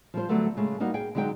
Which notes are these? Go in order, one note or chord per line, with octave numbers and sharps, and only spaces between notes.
F3 G3 C5
D3 F#3 G3 A3 B3
C#3 G#3 A3
G3 A#3 D#4 F#4
G#4 G5
D3 F#3 G#3 D#4 G5